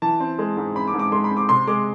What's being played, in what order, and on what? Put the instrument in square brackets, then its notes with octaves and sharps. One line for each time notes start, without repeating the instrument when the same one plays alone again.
[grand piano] E3 A5
C4
G#3
G#2
C4 B5
D6
G#2
D6
G#3 C6
B5
C4
D6
C3 C6
G#3 D6